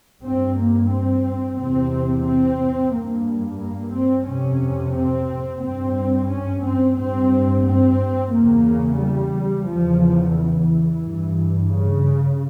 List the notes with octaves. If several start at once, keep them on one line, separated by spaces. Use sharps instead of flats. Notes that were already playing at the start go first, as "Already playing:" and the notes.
G2 C4
A#3
C4
E2 C3 C4
C4
G2 A#3
A#3
C4
F2 C3 C#4
C4
G2 C4
C#4
C4
G2 C4
C4
E2 C#3 A#3
G3
E2 C#3 F3
E3
G2
C#3